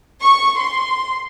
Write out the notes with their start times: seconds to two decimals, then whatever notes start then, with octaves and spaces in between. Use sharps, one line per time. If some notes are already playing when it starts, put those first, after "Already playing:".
0.23 C#6
0.59 C6